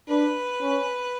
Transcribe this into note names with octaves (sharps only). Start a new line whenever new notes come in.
D4 B4
C#4